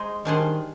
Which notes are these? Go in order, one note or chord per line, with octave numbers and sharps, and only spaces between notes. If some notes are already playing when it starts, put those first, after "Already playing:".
Already playing: G#3 D#4 G#4 C5
D#3 G3 D4 G#4 C5